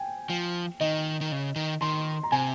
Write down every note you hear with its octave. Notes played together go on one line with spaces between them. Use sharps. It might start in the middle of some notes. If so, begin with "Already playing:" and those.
Already playing: G5 G#5
F3
D#3 D#5
D#3
C#3
D#3
D#3 C6
A#5
C3 G#5